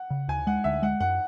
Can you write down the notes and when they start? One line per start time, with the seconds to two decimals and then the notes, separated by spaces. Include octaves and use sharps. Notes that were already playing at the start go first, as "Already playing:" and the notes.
Already playing: F#5
0.10 C#3
0.28 D2 G#5
0.47 G#3 F#5
0.64 D2 E5
0.82 G#3 F#5
1.00 F#2 F#5